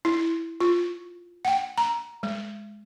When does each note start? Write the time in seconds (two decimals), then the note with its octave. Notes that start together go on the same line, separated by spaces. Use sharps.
0.05 E4
0.61 F4
1.45 F#5 G5
1.78 A#5
2.23 G#3